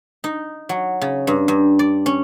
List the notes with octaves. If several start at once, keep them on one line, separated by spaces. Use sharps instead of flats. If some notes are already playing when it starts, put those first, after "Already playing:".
D#4
F#3
C#3
G2
G2
D5
C#4